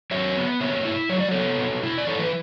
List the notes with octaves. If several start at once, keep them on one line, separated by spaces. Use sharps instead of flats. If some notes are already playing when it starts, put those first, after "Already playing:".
F#3 C#5 E5
B3
B2 C#5 E5
E4
F#3 C#5
D5
B3 A4 C#5
B2
E4
D5
E3 A4 C#5
B4